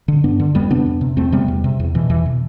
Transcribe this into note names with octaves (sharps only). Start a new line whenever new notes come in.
D3
G2 B3 D4
D3
F2 G3 B3
C3 B3 D4
F2
C3
E2 A3 C4
C3 G3 B3
E2
C3
E2
B2 E3
E2 E3
B2